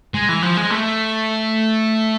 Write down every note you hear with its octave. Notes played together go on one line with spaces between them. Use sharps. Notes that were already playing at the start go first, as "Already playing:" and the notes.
G#3
E3
F3
G#3
A3